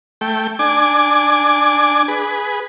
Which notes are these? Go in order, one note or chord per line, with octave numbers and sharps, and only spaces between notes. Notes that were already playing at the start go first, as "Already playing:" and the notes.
A3 G5
D4 G#5 D6
G#4 B4